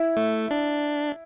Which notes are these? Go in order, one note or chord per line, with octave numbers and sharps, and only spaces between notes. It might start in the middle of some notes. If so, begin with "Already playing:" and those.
Already playing: E4
A3
D4